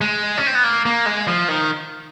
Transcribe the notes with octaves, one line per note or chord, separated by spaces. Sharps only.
G#3
C#4
C4
B3
A#3
A#3
G#3
F3
D#3